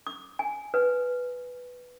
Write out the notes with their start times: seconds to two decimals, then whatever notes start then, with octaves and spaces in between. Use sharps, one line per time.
0.07 D6
0.39 G#5
0.74 B4